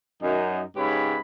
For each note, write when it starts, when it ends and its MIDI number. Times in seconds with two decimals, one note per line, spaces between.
0.22 0.63 42
0.22 0.63 63
0.77 1.19 44
0.77 1.19 49
0.77 1.19 67
0.77 1.19 71
0.77 1.19 73
0.77 1.19 83